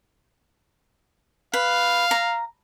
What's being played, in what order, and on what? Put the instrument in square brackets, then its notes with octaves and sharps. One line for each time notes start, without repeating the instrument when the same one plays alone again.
[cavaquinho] B4 [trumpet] F5
[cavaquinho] A#5